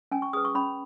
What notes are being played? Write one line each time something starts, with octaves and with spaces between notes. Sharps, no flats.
C#4 G#5
C#6
G#4 B4 D#6
C#6
C#4 B5